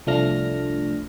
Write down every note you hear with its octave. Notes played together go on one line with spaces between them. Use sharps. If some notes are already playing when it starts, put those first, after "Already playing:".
C2 F3 A3 D4 F6 A#6